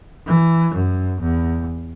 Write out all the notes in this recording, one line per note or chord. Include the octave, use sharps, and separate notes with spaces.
E3
F#2
E2